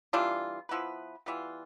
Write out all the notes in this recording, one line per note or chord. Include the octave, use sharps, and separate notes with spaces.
E3 G3 D4 F4
F3 B3 E4 B4
E3 G3 B3 F4